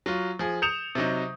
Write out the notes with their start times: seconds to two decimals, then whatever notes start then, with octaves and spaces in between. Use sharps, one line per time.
0.06 F#3 F4
0.39 F3 G#4
0.62 D#6 G6 C#7 E7 F7
0.95 C3 F#3 D#4